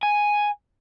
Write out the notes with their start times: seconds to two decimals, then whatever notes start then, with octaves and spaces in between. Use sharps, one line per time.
0.03 G#5